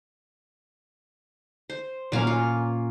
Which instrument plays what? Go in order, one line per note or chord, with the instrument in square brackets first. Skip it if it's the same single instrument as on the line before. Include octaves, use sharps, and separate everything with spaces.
[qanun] C5
[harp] A#2 A#3 C#4 [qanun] F#3 F5
[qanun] F4